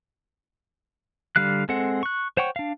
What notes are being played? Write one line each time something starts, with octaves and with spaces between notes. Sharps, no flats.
D3 G3 F5 F#6
G#3 C4 A4 F#5
C#6 F#6
C5 C#5 F#5 G5 C#6
D4 F5